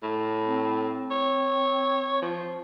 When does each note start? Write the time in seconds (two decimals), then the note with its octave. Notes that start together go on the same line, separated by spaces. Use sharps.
0.03 A2
0.44 C4
1.11 C#5
2.22 F3